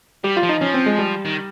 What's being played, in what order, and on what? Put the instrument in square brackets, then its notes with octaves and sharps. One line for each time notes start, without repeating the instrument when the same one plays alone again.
[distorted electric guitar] G3 [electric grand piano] G4
[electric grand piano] F4
[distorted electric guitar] F3
[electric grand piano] D#4
[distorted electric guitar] F3 [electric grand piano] C#4
[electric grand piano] C4
G#3
G3
[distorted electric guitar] D#3